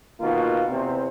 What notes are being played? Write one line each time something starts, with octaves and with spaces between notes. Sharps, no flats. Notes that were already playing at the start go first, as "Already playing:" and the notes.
B2 D#3 A#3 F4
E2 C3 B3 C5